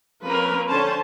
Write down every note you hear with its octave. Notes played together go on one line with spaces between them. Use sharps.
F3 A#3 C4 C#4 A#4 B4
D3 C#4 C5 A5